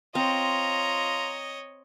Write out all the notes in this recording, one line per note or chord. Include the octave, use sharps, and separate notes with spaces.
C4 F4 C#5 D#5 A#5